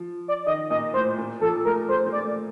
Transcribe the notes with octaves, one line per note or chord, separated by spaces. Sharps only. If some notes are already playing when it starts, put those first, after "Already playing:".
Already playing: F3
D5
D#3 D#5
A#2 D#5
A2 C5
A#2
F3 A4
A3 A#4
A3 C5
A#3
D5
A3